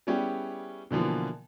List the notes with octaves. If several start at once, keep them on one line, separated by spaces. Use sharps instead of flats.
G3 B3 C#4 E4 G4 G#4
B2 D3 E3 F3 A#3